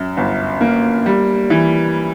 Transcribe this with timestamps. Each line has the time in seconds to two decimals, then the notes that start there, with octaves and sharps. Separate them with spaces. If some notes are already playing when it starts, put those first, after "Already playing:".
Already playing: F#2
0.17 G1
0.61 A#3
1.06 G3
1.50 E3